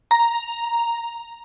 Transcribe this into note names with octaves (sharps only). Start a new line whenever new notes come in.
A#5